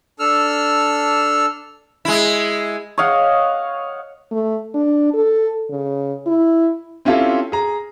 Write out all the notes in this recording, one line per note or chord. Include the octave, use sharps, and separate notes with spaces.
D4 A4 E6 F6
G#3 E4
C#5 D#5 F5 F#5
A3
D4
A4
C#3
E4
C4 C#4 E4 F4 G4 A4
G#4 A#5